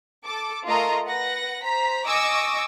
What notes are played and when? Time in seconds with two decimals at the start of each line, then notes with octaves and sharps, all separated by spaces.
0.25 A4 A5 D6
0.66 A3 F4 A4 A#4 D#5 A#5
1.06 B4 F#5 A#6
1.64 C5 A#5 B6
2.06 D#5 G#5 C#6 D6 E6 A#6